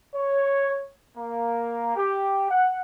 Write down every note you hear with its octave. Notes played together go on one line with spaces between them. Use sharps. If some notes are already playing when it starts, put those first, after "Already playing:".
C#5
A#3
G4
F#5